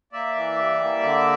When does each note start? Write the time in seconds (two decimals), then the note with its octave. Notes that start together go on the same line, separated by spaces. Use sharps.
0.12 A#3 D5 E5
0.35 E3
0.59 G3
0.81 A#3
1.03 D3